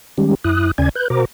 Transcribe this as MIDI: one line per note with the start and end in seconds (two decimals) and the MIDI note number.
0.18 0.35 51
0.18 0.35 55
0.18 0.35 56
0.18 0.35 61
0.18 0.35 67
0.44 0.71 42
0.44 0.71 64
0.44 0.71 87
0.44 0.71 90
0.78 0.89 39
0.78 0.89 49
0.78 0.89 61
0.78 0.89 74
0.78 0.89 80
0.78 0.89 92
0.95 1.08 71
0.95 1.08 90
0.95 1.08 91
1.10 1.25 47
1.10 1.25 66
1.10 1.25 70
1.10 1.25 72
1.10 1.25 82
1.10 1.25 86